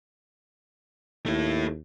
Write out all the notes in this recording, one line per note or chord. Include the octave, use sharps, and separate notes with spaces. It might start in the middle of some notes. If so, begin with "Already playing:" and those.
D#2 A3 E4